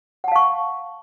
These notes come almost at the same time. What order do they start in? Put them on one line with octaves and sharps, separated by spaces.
F#5 A5 F5 C#6